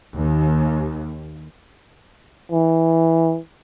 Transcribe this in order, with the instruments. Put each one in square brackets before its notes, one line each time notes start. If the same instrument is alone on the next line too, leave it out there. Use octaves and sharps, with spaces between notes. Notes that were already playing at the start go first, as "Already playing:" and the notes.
[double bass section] D#2
[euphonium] E3